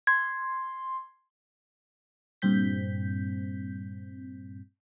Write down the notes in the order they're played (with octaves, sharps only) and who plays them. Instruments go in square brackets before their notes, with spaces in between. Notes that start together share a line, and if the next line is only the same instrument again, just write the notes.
[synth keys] C6 [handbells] G#6
[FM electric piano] G2 A#2 C4 G6 B6